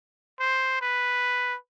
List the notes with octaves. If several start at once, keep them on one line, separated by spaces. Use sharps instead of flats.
C5
B4